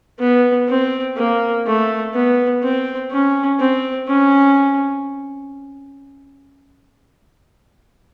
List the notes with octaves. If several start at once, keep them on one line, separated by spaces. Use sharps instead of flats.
B3
C4
A#3
A3
B3
C4
C#4
C4
C#4